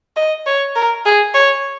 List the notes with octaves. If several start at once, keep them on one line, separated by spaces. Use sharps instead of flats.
D#5
C#5
A#4
G#4
C#5